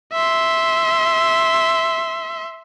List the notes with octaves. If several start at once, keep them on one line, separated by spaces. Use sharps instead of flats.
E5 C6